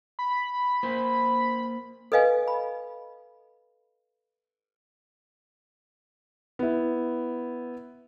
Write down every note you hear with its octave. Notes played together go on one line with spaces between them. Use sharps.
B5
A#3 F4 C5
A4 B4 D#5 F5 G#5
B5
B3 E4